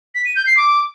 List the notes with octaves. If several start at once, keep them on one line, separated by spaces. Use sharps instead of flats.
B6
D#7
G6
C7
D6